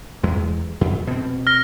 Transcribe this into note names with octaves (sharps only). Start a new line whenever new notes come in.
E2 G#3
F2
B2 C4
F6 A#6